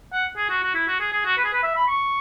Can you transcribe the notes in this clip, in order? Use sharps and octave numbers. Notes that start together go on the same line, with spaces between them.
F#5
G#4
F#4
F#4
E4
F#4
G#4
G#4
F#4
B4
G#4
B4
E5
B5
C#6